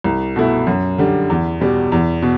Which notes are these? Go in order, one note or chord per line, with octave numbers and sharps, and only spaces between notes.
C2
B2 A3 E4
F#2
D3 G3
E2
B2 G3
E2
B2